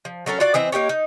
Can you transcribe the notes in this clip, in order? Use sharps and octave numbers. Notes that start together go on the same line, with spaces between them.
F3
F#3 C#4 A4 A#4
F4 F#4 D5
E3 C4 D#5 E5
A#3 D#4 G4 C#5
D#4